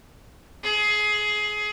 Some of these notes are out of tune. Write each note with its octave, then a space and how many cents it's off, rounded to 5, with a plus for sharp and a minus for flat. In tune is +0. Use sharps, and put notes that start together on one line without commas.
G#4 +20